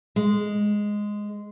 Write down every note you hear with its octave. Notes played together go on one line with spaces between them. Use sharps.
G#3